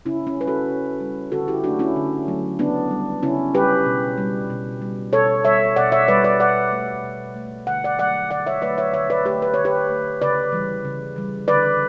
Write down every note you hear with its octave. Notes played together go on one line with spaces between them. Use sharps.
C#3 C#4 E4
C#4
G3 B4
F#4 A4
C#3
G3
D3 F#4 A4
E4 G4
F#3 A3 D4 F#4
C#4 E4
D3
F#3 A3
C#3 B3 D4
G3
C#3 C#4 E4
G3 G4 B4
B2
G3
B2
G3
B2 A4 C#5
G3 C#5 E5
B2 D5 F#5
C#5 E5
G3 B4 D5
B4 D5
B2 D5 F#5
A3
B2
A3
D3 F#5
D5 F#5
F#3 A3 D5 F#5
D3 D5 F#5
C#5 E5
F#3 A3 B4 D5
C#5 E5
D3 C#5 E5
B4 D5
A3 G4 B4
B4
D3 C#5
G4 B4
A3
C#3 B4 D5
E3 G3
C#3
E3 G3
D3 B4 D5